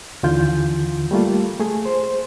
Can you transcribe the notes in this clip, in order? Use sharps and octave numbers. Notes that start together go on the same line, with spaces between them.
D#2 D3 E3 F4 G6
G3 A3 A#3 F4
A3 G#4
C5